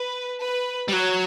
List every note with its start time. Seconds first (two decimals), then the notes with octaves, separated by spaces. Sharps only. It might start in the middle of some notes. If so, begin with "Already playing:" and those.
Already playing: B4
0.42 B4
0.88 G3
0.93 F#3 C#5